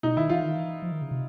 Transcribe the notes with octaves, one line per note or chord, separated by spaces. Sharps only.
B2 D#4
D#3 E4
E3 F4
D#3
E3
F3
D#3
C#3
C3